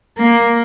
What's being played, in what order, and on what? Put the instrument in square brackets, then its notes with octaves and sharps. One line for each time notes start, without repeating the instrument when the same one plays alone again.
[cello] A#3